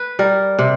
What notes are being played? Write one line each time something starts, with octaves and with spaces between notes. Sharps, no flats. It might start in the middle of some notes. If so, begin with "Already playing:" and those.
Already playing: B4
G3 A#4
C3